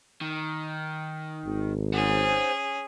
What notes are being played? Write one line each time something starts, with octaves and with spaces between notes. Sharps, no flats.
D#3
G#1
C#4 G#4 C5 F#5